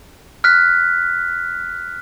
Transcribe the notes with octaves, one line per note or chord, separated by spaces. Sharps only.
F6 F#6 B6